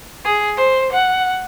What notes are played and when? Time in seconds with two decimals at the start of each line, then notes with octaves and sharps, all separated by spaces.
0.25 G#4
0.57 C5
0.92 F#5